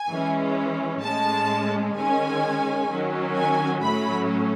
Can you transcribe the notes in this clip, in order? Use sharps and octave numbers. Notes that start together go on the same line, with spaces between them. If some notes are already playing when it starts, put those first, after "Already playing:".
Already playing: G#5
E3 G#3 C#4
A2 G#3 C#4 A5
D#3 G#3 C#4 G#5
D#3 F#3 C#4
G#5
A2 F#3 A3 C#4 B5